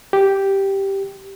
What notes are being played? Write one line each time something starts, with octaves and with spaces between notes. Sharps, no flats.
G4